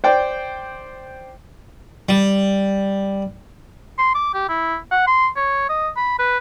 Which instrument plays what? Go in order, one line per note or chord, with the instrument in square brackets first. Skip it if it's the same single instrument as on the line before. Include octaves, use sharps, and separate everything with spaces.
[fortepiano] C5 D5 G5
[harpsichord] G3
[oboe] C6
D6
G4
E4
F#5
C6
C#5
D#5
B5
B4